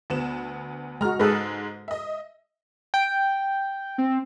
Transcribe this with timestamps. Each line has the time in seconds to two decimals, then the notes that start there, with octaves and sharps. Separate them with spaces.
0.10 D2 B3 E7
1.01 G#3 F#4 A#5 F6
1.19 G#2 G#3 G#4 A4 B4
1.88 D#5 E5
2.94 G5
3.98 C4